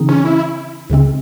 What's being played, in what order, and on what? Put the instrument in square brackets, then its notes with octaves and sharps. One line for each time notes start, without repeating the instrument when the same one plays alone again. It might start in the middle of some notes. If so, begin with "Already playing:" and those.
Already playing: [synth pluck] C#3 E3 C4 D#4 G#4
[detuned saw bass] C#4
E4
[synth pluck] C#2 C#3 G#3 C4